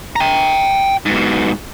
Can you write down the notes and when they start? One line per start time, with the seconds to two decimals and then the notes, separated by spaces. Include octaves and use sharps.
0.16 G5 A#5
1.06 G#2 B2